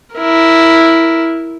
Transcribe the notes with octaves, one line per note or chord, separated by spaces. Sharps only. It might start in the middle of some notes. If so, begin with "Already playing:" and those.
E4 A#4